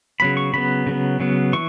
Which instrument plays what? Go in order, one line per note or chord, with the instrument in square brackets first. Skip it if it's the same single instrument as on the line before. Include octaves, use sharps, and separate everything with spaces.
[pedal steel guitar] C#3 F#3 B3 B5
C#6
C#3 F#3 B3 B5
C#3 F#3 B3
C#3 F#3 B3
E3 C#6